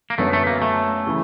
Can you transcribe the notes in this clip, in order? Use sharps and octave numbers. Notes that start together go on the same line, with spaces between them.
A#3
F#2 D3 F#3 A3 B3
A3
A#3
A3
C#3 E3